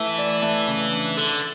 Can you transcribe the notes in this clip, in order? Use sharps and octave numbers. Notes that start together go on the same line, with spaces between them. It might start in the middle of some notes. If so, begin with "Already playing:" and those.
Already playing: E3 A3
D5
A3
C#3
D4
D3 A4